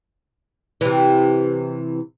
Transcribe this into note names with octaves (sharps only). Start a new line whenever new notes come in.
C3 E3